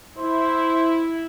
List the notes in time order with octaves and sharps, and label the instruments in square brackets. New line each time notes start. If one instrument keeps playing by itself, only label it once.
[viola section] E4 [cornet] C5